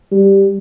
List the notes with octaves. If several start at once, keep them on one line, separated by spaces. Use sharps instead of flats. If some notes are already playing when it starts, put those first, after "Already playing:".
G3